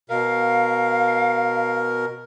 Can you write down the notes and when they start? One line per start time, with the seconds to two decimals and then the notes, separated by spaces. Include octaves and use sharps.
0.10 B2 A#4 F5